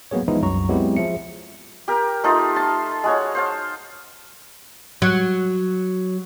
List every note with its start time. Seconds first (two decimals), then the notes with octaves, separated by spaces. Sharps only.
0.11 F#3 A#3 B3 G#4 C#5
0.28 E3 F3 G#3 B3 D#4 E4
0.41 C2 F#2 F#3 A#5 C#6
0.69 F#3 G#3 B3 C4 E4 G4
0.96 F3 G#4 E5 C#7
1.88 G4 A#4
2.24 A3 D#4 F4 C5
2.56 A5 C6
3.04 G#3 F#4 C#5
3.35 C5 F5 A5
5.02 F#3